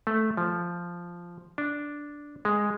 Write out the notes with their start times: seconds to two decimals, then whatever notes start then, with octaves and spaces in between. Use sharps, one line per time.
0.07 A3
0.37 F3
1.58 D4
2.45 G#3